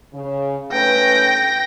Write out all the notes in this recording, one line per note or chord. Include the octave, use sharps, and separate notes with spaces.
C#3
A3 C#4 B4 G5 A#6